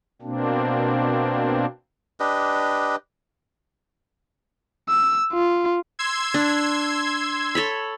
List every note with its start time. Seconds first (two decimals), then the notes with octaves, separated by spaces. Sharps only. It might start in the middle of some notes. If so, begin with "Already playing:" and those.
0.22 B2 A#3 C4 D4
2.20 D4 G4 B4 D#5
4.89 E6
5.33 F4
5.99 C6 E6 G#6
6.34 D4
7.55 A4 C#5 B5